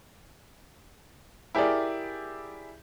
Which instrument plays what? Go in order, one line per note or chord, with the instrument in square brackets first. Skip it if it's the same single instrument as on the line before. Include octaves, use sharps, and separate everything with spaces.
[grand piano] E4 G4 G#4 A#4 D5